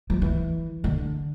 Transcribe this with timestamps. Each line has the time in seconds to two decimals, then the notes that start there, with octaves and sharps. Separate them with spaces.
0.10 F3
0.22 E3
0.84 D3